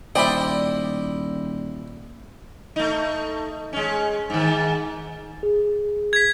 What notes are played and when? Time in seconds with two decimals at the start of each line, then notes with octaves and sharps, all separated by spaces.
0.15 D#1 E4 C5 D5 D#5 G5 B5
2.76 A3 D#4
3.73 G#3 C#4
4.30 G#2 D#3
5.43 G#4
6.13 G#6 B6